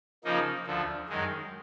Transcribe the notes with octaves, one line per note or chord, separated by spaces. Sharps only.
C#3 F3 A#3 D#4
D2 D3 F3
F#2 D#3 G#3